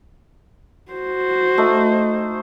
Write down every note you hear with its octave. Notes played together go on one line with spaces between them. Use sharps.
F#4 C5
A3 D#4